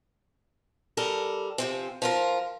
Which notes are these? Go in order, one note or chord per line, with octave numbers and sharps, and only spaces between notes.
G3 A4 A#4
C3 F3 C4
F3 F4 A#4